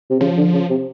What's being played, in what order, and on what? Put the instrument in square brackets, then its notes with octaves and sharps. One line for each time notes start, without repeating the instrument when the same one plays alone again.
[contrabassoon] C3
[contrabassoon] C#3 [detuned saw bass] F3
[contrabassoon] D3
C#3
C3